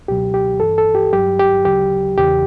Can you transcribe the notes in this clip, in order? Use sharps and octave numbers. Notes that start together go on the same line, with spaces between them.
C#2 B2 F#3 G4
G4
G2 E3 A4
A4
G4
G2 F#3 G4
G4
D2 C#3 F#3 G4
E2 C#3 E3 G4